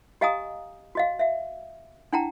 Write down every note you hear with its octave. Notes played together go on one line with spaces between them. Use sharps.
G4 D#5 F5 G#5 A#5 D#6
F#4 D#5 F5
E5 F5
D4 E4 F#5 G5 A5 A#5